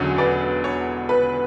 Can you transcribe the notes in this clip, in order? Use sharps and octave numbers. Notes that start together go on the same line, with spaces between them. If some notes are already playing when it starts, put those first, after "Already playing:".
Already playing: E1 E2 D3 F#3 C#4 C#5
B4 D5
C#5
B4